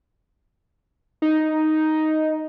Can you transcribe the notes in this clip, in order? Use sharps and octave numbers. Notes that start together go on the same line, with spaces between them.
D#4